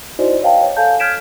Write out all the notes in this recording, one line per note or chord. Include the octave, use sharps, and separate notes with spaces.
D#4 E4 F#4 C5 D5 D#5
B4 C#5 D#5 F5 G5 A5
C#5
A4 C#5 F5 G#5 A5 G6
F6 G6 G#6 B6 D7 E7